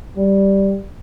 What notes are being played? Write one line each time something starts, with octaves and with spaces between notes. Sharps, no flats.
G3